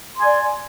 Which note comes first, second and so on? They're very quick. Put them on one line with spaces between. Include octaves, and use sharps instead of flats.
C6 G#5 D5